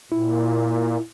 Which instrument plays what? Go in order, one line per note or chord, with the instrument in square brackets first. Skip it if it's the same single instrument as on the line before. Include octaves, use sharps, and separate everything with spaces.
[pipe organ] A#2 [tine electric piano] E4